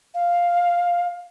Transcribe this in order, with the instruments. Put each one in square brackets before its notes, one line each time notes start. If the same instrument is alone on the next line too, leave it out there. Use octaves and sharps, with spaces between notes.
[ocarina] F5